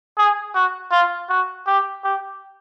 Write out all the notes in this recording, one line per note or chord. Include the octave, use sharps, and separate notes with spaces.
G#4
F#4
F4
F#4
G4
G4